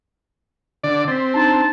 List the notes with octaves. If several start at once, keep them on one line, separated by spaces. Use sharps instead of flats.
D3 D5
C4 A6 B6
D4 D#4 A5 A#5